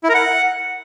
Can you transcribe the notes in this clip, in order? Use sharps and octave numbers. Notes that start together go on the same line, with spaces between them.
E4
A#4
F#5